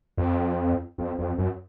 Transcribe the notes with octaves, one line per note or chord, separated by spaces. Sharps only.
F2
F2
F2
F#2